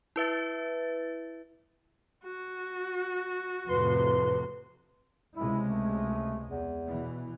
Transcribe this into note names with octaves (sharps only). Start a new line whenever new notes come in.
E4 B4 E5 A6
F#4
F2 A2 C3 B4 C6
C#2 C3 G#3 E4
A3
E2
B2 E3